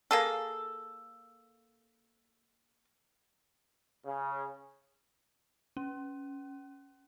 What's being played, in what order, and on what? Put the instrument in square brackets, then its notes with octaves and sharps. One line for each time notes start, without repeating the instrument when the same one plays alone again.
[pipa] A#3 G#4 A4
[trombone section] C#3
[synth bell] C#4